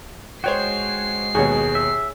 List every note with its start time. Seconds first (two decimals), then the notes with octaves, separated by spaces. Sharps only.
0.44 G#3 F#4 C5 C#5 G5 C7
1.35 D#2 B2 G#4 C#5
1.75 E5